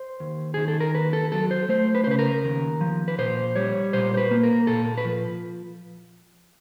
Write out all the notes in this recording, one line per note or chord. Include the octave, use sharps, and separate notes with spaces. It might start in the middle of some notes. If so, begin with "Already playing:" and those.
Already playing: C5
D#2
D#3 G#4
A4
A#4
D#2 B4
A4
F#3 A4
C5
A3 C5
B4
C5
C#3 B4
A#4
D#2
F3
B4
A#2 C5
G3 C#5
A#2 C5
C5
B4
A#3
A#4
A#2 A4
B4
F3